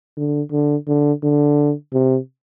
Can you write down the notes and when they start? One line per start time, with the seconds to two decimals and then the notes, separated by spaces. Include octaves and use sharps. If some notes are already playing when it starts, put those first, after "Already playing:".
0.17 D3
0.52 D3
0.88 D3
1.24 D3
1.93 C3